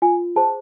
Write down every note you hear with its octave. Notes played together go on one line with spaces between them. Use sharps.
F4 G#5
G#4 C5 A5